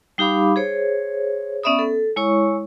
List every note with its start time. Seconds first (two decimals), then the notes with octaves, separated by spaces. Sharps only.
0.18 G3 D#4 G4 F5 B5 D6
0.56 G#4 C5 C#5
1.63 B3 C#4 D5 E5 B5 D#6
1.79 A4
2.16 G#3 E4 C#5 C#6